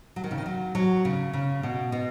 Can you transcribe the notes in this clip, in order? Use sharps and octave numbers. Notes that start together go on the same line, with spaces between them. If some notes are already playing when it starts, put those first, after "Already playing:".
F#3
D#3
C#3
D#3
F#3
F#3
C#3
C#3
B2
B2